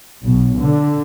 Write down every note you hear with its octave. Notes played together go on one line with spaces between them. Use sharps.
B1
D3